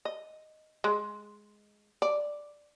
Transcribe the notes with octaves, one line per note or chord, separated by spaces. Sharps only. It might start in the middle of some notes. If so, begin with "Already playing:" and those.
D#5
G#3
D5